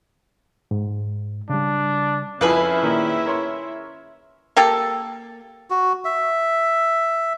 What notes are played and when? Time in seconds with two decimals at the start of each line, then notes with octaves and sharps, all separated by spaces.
0.71 G#2
1.50 C#3 G3 D4
2.41 F2 C#4 E4 G#4 B4 E5 F5
2.83 A#2 D#3
3.26 A#4 C#5 C6
4.56 A#3 G4 A4
5.70 F#4
6.05 E5